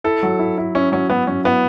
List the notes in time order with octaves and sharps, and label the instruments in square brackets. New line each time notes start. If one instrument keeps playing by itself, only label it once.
[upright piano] E4 [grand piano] A4
[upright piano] F#3
E4
E4
[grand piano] C#4 [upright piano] E4
[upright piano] F#3 [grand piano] C#4
[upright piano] F#3 [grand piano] B3
[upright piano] F#3 [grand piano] C#4
[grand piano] B3 [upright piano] E4